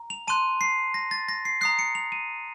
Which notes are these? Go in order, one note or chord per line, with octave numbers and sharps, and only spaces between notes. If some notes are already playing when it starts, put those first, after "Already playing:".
Already playing: A#5
F7
A5 C6 F#6 D#7
C7
A#6
A6
A#6
C7
A#5 D#6 F#6 C7
C#7
F7
D#7